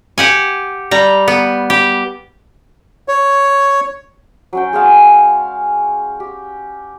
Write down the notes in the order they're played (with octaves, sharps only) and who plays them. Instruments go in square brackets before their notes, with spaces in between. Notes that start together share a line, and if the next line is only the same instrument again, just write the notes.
[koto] G4 F#5 G#5
G3 A#5
B3
G4
[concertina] C#5
[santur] F#3 C#4 G5
G#3 G#4 F5 A5
G4